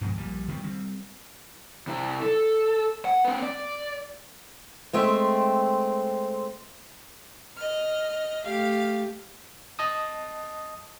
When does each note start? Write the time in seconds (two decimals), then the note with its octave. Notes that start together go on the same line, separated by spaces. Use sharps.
0.01 G2 B2 F3 G#3
0.17 A#1 A#2 G3
0.48 D#3 G3 G#3 B3
0.64 G3 C4
1.87 C3 E4
2.23 A4
3.05 F#5
3.25 C4 B4
3.42 D5
4.93 G#3 A3 C4 E5
7.58 D#5 F6
8.44 A3 G4 F5
9.79 D#5 A5 D#6